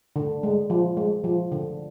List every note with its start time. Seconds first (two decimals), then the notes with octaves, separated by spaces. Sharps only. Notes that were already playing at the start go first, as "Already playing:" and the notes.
0.16 D3
0.43 G#3
0.70 F3
0.97 G#3
1.24 F3
1.52 D3